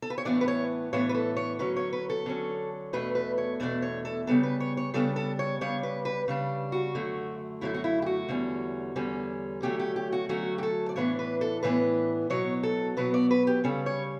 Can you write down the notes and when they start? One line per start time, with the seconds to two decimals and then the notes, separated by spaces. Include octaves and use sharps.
0.02 A4
0.10 B4
0.18 C#5
0.25 A2 E3 B3 D4 D5
0.41 B4
0.48 C#5
0.93 A2 E3 B3 D4 C#5
1.09 B4
1.15 A4
1.37 C#5
1.59 D3 F#3 C#4 B4
1.76 C#5
1.93 B4
2.10 A4
2.26 D3 F#3 C#4
2.93 E2 B2 A3 D4 B4
3.15 B4
3.38 C#5
3.60 E2 B2 A3 D4 D5
3.82 C#5
4.05 A4
4.27 C#3 G3 B3 D4 A4
4.43 B4
4.60 C#5
4.77 C#5
4.94 C#3 G3 B3 D4 A4
5.16 A4
5.39 C#5
5.61 C#3 G3 D4 C#5
5.83 B4
6.05 B4
6.28 C#3 G3 D4
6.72 F#4
6.95 F#2 D3 A3
7.61 F#2 D3 A3 E4
7.74 F#4
7.84 E4
8.02 G4
8.06 F#4
8.28 E2 D3 G3 C#4
8.96 E2 D3 G3 C#4
9.63 D3 F#3 A3 C#4 G4
9.79 G4
9.96 G4
10.12 F#4
10.29 D3 F#3 A3 C#4 F#4
10.58 G4
10.63 A4
10.89 D5
10.96 A2 E3 B3 D4 C#5
11.19 B4
11.41 A4
11.63 A2 E3 B3 D4 B4
12.30 B2 F#3 B3 C#5
12.63 A4
12.97 B2 F#3 B3 B4
13.14 D5
13.31 B4
13.47 G4
13.64 C#3 G3 C#4 A4
13.86 C#5